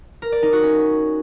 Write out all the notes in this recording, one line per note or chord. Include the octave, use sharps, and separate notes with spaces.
A#4
D5
D#4
F#4
C#4